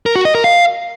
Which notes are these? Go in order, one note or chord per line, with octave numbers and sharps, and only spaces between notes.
A#4
F#4
D#5
A#4
F5